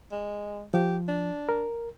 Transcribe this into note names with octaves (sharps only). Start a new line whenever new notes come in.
G#3
F3 G4
D4
A#4